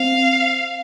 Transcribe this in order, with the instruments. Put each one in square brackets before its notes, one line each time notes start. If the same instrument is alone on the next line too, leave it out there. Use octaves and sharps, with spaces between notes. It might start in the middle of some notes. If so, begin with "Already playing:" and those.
Already playing: [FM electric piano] C4 [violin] F5